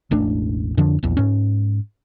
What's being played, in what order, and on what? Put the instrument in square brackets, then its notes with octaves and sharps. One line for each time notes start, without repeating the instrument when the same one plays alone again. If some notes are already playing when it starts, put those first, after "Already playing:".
[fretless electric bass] E1 A1 A3 D4
F2 D3 F3 D4
A#1 E2
G#2 C#4